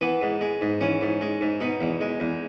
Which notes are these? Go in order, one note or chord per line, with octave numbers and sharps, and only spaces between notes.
E3 B3
G#2
G#3
G#2
E3 C#4
G#2
G#3
G#2
B2 D#4
E2
G#3
E2